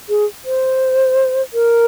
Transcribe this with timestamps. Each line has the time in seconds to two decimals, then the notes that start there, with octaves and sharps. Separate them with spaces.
0.09 G#4
0.45 C5
1.54 A#4